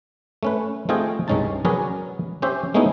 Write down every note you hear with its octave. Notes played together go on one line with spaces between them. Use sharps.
A3 C#4 B4
A3 C4 F4 G#4 D#5 G5
C2 G2 G#3 C#4 D#4 A5
F#3 C#4 G#4 A#4 B4 D5
C#4 G4 C5 E5
G#3 A3 B3 C#4 D#4 E4